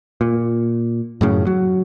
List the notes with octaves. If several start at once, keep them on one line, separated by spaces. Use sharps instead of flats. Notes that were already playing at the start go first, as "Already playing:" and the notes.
A#2
F#2 A2 C#3
F#3